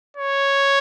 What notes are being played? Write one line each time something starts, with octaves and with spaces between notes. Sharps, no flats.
C#5